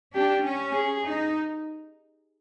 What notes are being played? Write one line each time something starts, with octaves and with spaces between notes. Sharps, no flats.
D4 G4
C#4
G#4
D#4